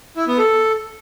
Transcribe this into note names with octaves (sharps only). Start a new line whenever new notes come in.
E4
B3
A4